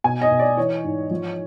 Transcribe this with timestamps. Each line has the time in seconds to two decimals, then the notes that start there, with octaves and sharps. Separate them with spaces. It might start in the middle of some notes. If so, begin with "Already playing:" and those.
0.04 B2 G#5
0.22 D#5
0.31 B2
0.39 D5
0.57 E3 C#5
0.84 G#2
1.11 F3